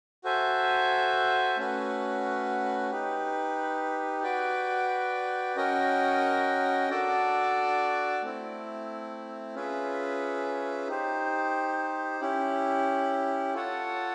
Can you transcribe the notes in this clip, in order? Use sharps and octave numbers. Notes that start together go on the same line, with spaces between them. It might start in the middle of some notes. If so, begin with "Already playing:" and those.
F#4 A4 C5 E5 G#5
A3 C#4 F#4 B4
D#4 G4 B4
F#4 B4 D5 G5
C#4 F#4 A#4 D#5 G5
D4 F#4 A4 D5
A3 C4 E4
C#4 F4 G#4 B4 E5
D#4 G4 C5
C#4 E4 G4
F4 A4 C#5 F#5 A5